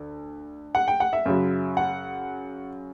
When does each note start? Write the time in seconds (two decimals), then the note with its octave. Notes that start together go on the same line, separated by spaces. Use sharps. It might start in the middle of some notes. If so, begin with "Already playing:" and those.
Already playing: D2
0.75 F#5
0.88 G5
1.00 F#5
1.13 E5
1.26 F#2 C#3 F#3
1.77 F#5